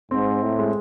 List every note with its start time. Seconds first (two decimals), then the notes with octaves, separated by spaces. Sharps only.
0.11 G#2 C4
0.43 A2
0.59 G#3